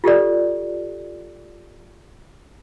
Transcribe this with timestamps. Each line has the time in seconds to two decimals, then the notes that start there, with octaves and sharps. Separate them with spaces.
0.04 F4 G4 A4 D5